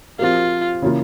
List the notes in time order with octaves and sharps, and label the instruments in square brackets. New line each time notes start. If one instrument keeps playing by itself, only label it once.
[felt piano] F3 C4 G4 A#4 [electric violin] F4
[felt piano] C#3 E3 A#3 F4